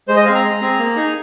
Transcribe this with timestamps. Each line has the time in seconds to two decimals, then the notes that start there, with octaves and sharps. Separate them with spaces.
0.08 G#3 C5
0.16 D#5
0.25 G#4 F5
0.30 C4
0.35 A#5
0.43 G#3
0.61 C4 G#4
0.79 A#3
0.96 D#4 G#4